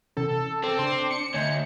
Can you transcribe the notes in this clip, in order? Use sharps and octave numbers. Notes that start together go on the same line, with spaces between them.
C3 E3 C#4 A4
C4 A4 D6
C#3 D4 C6
C#7
D2 D3 C#5 D#5